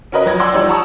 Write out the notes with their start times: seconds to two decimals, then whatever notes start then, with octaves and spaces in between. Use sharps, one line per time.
0.12 C#4 F#4 A#4 B4 D#5
0.25 F2 F#3 G#6 A#6
0.40 D5 F#5 G#5 C6 D6 E6
0.52 F3 G3 D#4 C#5 D5
0.68 F#5 A5 A#5 C#6 D#6